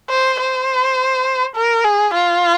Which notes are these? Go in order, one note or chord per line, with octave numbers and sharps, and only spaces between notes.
C5
C5
A#4
G#4
F4